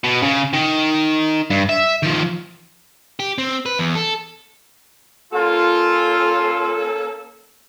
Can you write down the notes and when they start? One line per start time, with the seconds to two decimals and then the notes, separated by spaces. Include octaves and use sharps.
0.04 B2
0.22 C#3
0.53 D#3
1.50 G2
1.69 E5
2.03 D#3 F3
3.20 G4
3.38 C4
3.66 B4
3.79 E2
3.95 A4
5.33 A#3 C#4 F4 A4